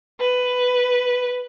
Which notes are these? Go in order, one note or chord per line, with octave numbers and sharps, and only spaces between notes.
B4